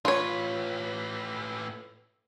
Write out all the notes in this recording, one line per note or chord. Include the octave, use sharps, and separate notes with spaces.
A2 F4 B4 C#5